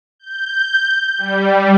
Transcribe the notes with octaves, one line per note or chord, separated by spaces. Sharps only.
G6
G3